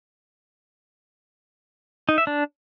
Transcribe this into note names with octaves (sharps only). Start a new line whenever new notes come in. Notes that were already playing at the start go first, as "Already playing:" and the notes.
D#4
E5
D4